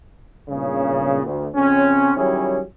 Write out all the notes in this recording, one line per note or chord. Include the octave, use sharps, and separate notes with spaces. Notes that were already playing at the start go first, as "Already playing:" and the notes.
B1 G2 A#2 C#3
D2
F2 C#3 C4 C#4
D#3 F#3 G3 C#4 E4 G#4